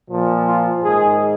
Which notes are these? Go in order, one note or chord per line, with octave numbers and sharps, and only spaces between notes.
A#2 F3
F4
G#2 D#3 G#4